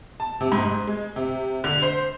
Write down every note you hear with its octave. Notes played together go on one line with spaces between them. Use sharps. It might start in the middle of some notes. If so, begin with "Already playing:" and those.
A5
C3
G#2
G#2
G#3
C3
D3
C5